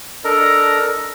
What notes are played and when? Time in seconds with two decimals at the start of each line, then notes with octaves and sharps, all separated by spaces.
0.24 D4 A4 A#4 D#5 A#5